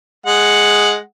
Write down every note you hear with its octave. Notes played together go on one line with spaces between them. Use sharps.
G#3 F#5